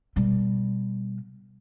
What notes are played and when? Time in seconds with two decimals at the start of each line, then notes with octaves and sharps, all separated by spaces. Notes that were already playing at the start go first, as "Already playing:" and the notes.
0.16 B2 G3